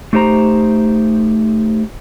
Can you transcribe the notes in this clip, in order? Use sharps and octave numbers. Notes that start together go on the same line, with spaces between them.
A3 D#4 G4 C5 A#5